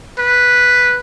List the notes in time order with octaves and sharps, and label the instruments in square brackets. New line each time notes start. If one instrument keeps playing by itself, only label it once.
[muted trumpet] B4